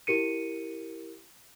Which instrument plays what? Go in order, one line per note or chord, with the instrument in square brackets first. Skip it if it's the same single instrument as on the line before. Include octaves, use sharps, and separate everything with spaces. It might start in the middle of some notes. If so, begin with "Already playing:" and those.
[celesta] E4 G4 A#4 C#7 D#7